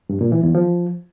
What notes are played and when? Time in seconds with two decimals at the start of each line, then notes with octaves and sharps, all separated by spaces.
0.09 G2
0.21 A#2
0.32 E3
0.43 E2
0.55 F3